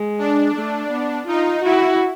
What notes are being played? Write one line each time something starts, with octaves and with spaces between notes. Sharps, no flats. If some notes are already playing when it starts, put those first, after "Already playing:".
Already playing: G#3
D4
A3
B3
D#4 F4
E4 F#4